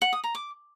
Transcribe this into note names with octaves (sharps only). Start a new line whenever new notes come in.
F#5
D#6
A#5
D6